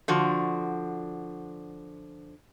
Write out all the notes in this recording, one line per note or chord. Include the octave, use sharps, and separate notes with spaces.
D3 F3 F#4